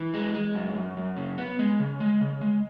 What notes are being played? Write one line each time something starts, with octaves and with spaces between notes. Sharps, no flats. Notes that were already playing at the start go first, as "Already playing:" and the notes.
Already playing: E3
G#3
G#3
F#2
F#2
F#2
C#3
B3
G#3
C#3
G#3
C#3
G#3